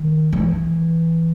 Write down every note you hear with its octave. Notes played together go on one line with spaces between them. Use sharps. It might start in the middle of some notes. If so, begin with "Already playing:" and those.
Already playing: D#3
E3